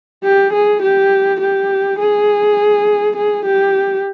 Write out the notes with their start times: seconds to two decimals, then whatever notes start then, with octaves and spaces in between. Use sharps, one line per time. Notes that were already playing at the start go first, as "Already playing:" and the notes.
0.24 G4
0.53 G#4
0.82 G4
1.41 G4
1.99 G#4
3.16 G#4
3.46 G4